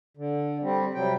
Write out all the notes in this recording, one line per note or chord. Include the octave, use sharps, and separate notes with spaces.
D3
G3 C4
C3 F#3 G3 G5